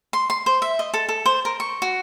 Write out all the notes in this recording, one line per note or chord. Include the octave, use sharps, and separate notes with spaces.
C6
C6
C5
E5
D#5
A4
A4
C5
A#4
C#6
F#4